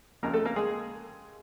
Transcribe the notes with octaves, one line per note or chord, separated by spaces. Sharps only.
D#2 C#3 F3 A#3 A#4
A3 A4
A#3 A#4
G#3 G#4